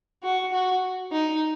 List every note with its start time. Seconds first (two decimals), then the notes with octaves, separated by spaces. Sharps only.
0.23 F#4
0.53 F#4
1.12 D#4